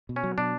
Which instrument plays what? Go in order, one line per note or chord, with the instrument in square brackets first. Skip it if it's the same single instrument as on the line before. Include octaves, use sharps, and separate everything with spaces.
[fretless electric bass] B2
[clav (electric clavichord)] C#4
[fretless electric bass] F#3
[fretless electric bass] B2 [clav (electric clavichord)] D4